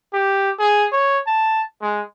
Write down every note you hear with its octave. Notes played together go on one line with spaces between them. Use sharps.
G4
G#4
C#5
A5
G#3